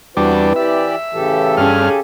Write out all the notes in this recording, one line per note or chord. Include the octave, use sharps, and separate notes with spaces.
E2 G3 C4 D4 E4 F#4 B4
E3 G4 D5 E5
A2 C#3 E3 G4 A4
G2 C#4 G#4 F6